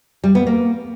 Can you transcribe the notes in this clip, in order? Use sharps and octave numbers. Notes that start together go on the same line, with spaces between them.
G3
B3
A#3